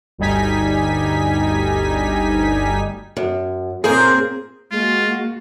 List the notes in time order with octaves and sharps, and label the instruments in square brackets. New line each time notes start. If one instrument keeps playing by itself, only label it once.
[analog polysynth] G1 D2 G3 D#4 G#5 B6
[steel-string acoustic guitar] F#2
[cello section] A#2 C4 [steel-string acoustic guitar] C#3 A#3 [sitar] G#4 [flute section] A#4 C6 G6
[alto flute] G#3 [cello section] A#3 F#4 [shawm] F4